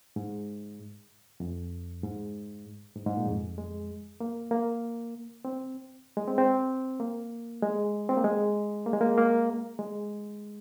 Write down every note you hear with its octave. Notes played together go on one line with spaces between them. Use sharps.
G#2
F2
G#2
G#2
G#2
A#2
F2
G#3
A#3
A#3
C4
G#3
C4
C4
A#3
G#3
C4
A#3
G#3
A#3
G#3
A#3
A#3
G#3